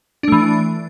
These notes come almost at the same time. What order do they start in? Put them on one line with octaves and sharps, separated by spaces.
D4 A3 E3